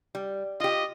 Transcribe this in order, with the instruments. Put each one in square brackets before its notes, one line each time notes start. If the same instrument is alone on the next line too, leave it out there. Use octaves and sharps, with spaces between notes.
[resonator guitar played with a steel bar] G3
[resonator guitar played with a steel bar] F4 G4 [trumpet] D#5